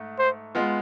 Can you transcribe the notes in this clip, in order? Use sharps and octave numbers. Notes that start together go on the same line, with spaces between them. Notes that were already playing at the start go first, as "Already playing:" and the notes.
Already playing: G#2 A3
C5
G#3 B3 F4